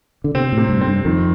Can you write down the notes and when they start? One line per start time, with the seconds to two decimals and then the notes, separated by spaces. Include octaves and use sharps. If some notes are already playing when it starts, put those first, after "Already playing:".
0.24 D3
0.35 C3 C4
0.52 A2
0.57 C3
0.69 G2
0.81 C4
0.87 G2
1.05 F2 D#3